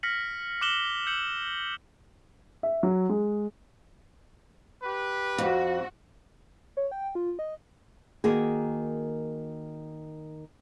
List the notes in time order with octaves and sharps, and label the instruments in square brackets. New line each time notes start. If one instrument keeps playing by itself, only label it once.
[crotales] F6 A#6 B6 C#7 F#7
D6 F6 F#6 E7 F#7 G7
E6 G6 C#7 F#7
[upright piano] E5
F#3
G#3
[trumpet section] G4 B4
[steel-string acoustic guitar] F2 [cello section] F#4
[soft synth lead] C#5
G5
F4
D#5
[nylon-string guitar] D#3 A#3 F#4 G#4